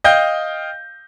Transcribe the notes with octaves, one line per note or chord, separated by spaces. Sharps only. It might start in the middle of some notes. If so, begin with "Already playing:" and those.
D#5 F5 G5 G6